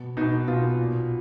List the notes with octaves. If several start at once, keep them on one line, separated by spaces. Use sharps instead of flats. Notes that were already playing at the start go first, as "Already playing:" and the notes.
Already playing: B2
B2 D#4
B2 F4
A#2